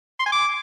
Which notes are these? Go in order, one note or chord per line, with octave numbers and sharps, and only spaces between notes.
C6
G#5
D6